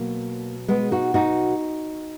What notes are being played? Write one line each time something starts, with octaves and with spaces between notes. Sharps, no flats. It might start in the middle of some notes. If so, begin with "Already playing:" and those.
Already playing: B2 F#3 A#3
G#3 B3
D#4 F#4
D#4 F#4